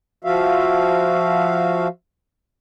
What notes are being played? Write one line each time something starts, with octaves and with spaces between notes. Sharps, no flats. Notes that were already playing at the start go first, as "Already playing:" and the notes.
F3 F#4 E5 F5